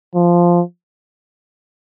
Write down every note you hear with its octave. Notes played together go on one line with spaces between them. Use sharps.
F3